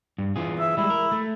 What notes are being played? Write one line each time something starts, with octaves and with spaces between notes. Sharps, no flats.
G2
E3 F4 G#4
E5
G3 G#3 E4
A#4
A3